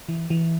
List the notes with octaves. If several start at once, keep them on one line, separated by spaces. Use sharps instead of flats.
E3
E3